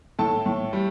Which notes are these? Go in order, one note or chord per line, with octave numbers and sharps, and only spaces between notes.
A2 A4 A5
A2
G3